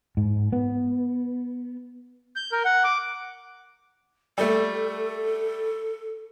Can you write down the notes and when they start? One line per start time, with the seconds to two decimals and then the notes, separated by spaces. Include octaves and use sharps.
0.17 G#2
0.53 B3
2.36 G6
2.52 A#4
2.65 F#5
2.84 D6
4.38 G3 A3 A4